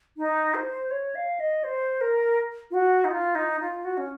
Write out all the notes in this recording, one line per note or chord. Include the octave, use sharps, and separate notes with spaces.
D#4
C5
C#5
F5
D#5
C5
A#4
F4
F#4
D#4
F4
D#4
F4
F#4
C#4